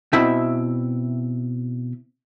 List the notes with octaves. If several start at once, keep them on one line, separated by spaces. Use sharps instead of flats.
B2 C4 E4 E5